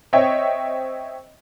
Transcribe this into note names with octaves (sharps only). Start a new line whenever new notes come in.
C4 C#5 D#5 E5 G5